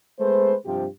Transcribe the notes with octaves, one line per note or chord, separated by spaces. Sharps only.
G#3 A3 B3 G#4 B4 C5
G2 C3 F3 F4 G4